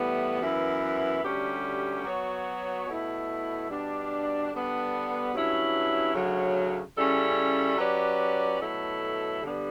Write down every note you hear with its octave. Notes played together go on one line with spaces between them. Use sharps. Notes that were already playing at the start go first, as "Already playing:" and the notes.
Already playing: A2 E3 G3 B3
F#2 E3 B3 E4 B4
D2 D3 G3 C#4 G4
F#3 B3 F#4 C#5
B2 A3 E4
B2 G3 D4
D3 G3 B3 D4
G2 F#3 C#4 E4
D2 C#3 F#3
C#3 G3 C#4 E4 A4
F#3 C#4 G4 B4 D5
B2 F#3 A3 E4 A4
G2 D3 G3 B3 D4